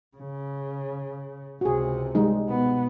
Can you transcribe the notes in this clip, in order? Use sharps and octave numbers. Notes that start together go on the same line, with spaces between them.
C#3
C#2 C3 F#4 G#4
G3 G#3 D#4
B2 B3